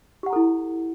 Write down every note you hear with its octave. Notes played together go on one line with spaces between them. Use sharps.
E4 G4 A4 F#5 A#5